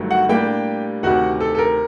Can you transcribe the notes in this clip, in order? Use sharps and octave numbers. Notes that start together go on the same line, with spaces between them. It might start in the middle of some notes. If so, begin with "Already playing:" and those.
Already playing: G1 G2 D#3 F#3 A3
F#4 F#5
A2 G3 A#3 D4 G4 G5
D2 C3 D#3 F#4 F#5
A4
A4
A#4